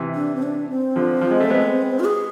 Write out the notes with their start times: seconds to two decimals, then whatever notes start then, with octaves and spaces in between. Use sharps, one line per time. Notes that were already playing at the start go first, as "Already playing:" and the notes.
Already playing: C3 E3
0.15 D4
0.35 C4
0.43 D4
0.70 C4
0.96 D3 F3
1.21 F3
1.31 G#3
1.40 A3
1.50 G#3 B3
2.00 F4
2.05 G#4